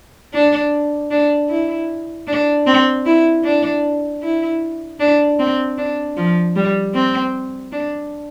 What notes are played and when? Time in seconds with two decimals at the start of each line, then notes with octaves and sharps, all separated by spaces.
0.33 D4
1.11 D4
1.50 E4
2.28 D4
2.66 C4
3.06 E4
3.44 D4
4.23 E4
5.00 D4
5.39 C4
5.78 D4
6.17 F3
6.56 G3
6.94 C4
7.72 D4